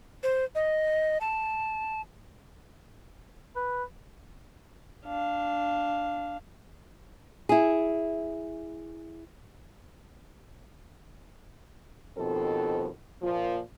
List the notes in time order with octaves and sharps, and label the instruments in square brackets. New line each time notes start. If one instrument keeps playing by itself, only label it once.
[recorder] C5
D#5
A5
[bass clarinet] B4
[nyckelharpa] D4 F5
[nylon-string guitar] E4 G#4
[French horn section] D#2 B2 F3 C4 A4
A#2 F3